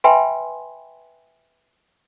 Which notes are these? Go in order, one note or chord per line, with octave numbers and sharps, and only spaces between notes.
B4 E5 G5 G#5 B5 C6